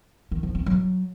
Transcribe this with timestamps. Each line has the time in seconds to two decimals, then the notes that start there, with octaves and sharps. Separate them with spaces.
0.31 D#3
0.43 F3
0.55 C4
0.66 F#3